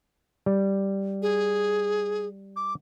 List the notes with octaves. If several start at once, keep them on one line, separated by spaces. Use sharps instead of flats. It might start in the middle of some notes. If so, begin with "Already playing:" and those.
G3
G#4
D6